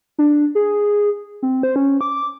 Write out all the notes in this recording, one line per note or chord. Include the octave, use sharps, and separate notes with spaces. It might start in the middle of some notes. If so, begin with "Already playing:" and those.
D4
G#4
C4
C5
C#4
D6